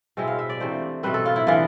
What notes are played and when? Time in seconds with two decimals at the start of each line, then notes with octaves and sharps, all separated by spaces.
0.17 B2 G#3 C4 E4
0.27 F5
0.39 E5
0.49 D5
0.60 C3 E3 A3 D4 C5
1.03 B2 A3 C4 B4
1.14 A4
1.25 F4
1.36 E4
1.47 E3 B3 D4 F4